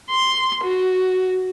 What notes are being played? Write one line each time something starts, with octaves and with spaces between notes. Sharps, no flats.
C6
F#4